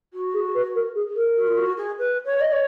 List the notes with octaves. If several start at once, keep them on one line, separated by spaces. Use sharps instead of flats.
F#4
G#4
B4
A#4
G#4
A#4
F#4
F4
F#4
G#4
B4
C#5
D#5
C#5